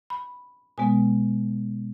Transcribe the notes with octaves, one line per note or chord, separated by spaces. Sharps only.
B5
B2 G#3 B3 G#5